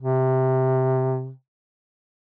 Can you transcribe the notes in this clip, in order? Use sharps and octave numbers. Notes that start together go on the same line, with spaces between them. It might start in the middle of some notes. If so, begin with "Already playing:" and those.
C3